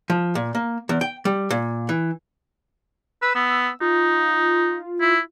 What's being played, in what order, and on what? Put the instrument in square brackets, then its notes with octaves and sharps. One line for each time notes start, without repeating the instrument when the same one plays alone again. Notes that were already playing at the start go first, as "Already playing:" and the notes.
[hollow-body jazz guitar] F3
A#2
A#3
E2
G5
G3
A#2
E3
[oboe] B4 [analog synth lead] E6
[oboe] B3
[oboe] D#4 [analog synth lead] F4
[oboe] E4